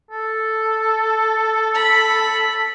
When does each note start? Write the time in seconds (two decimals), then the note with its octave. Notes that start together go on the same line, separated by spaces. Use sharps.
0.11 A4
1.74 B5